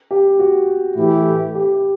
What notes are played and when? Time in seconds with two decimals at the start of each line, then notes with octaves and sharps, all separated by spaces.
0.11 G4
0.39 F#4
0.96 A2 E3 A3 E4 G4
1.55 G4